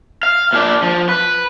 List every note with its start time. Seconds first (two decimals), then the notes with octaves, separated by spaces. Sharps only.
0.23 F5
0.53 A#2 D4
0.82 F3
1.09 B4